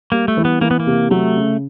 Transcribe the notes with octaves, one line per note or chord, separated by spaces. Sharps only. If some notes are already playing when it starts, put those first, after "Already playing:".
G3 A#3
A3
E3
B3
E3 A#3
B3
A#3
C3
F#3 A3
C#3